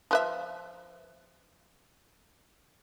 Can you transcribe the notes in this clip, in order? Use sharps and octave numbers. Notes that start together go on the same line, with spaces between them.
F3 B4 E5